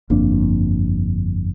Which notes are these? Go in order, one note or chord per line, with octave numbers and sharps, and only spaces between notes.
G1 F2 A#3 D4